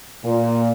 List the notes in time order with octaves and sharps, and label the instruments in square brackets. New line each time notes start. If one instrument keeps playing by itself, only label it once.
[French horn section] A#2